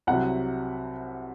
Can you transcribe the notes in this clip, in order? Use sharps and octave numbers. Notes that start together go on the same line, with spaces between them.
C2 C3 F#3 F#5